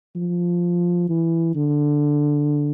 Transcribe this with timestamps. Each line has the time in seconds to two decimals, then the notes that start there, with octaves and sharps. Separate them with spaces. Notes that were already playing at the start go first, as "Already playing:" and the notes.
0.16 F3
1.09 E3
1.55 D3